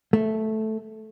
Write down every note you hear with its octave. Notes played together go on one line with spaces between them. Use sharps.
A3